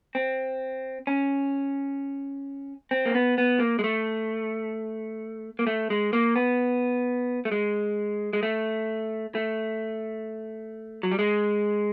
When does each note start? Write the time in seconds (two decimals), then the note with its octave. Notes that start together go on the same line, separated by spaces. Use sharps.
0.15 C4
1.07 C#4
2.91 C4
3.06 A#3
3.15 B3
3.38 B3
3.60 A#3
3.79 G#3
3.84 A3
5.59 A#3
5.67 A3
5.90 G#3
6.13 A#3
6.36 B3
7.45 A3
7.52 G#3
8.33 G#3
8.43 A3
9.35 A3
11.03 F#3
11.11 G3
11.19 G#3